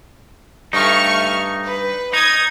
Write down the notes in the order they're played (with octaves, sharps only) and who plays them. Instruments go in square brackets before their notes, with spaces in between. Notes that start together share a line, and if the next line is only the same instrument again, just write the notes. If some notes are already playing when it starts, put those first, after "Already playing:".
[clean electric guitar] G2 D#4 [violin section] A3 C#6 F6
[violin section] B4
[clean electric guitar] D#4 [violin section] D#6 G#6